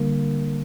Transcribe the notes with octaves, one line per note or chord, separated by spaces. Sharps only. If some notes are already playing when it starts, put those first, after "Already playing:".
Already playing: D3 G3 A#3